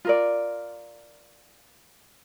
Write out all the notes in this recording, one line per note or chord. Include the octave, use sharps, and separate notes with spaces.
F4 A#4 D5